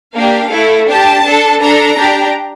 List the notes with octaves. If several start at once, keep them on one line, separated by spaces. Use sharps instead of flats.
A#3 D4 G4 F5
A3 E4 A4
D4 G4 A5
D4 A4
D4 A4 A#5
D4 G4